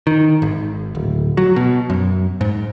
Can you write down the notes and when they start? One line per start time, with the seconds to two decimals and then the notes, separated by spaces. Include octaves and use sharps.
0.07 D#3
0.42 G#1
0.95 D1
1.37 F#3
1.56 B2
1.90 F#2
2.41 G#2